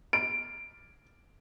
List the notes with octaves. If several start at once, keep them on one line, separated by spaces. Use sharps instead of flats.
D7